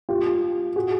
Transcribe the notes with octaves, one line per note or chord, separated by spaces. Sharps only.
F4 G4
F#4 G#4